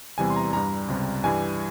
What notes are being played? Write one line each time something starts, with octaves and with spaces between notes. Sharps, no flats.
E2 C3 E3 G3 G#5
C6
A#5
G2 G3 A#5
C#2 C3 G3
G2 E3 G3 G#5